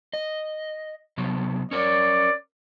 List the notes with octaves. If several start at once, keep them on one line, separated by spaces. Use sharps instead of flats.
D#5
C3 F#3 B3
C#4 A#4 C#5 D5